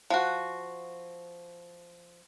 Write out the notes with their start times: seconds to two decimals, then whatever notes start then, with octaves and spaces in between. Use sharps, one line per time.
0.10 F3 F#4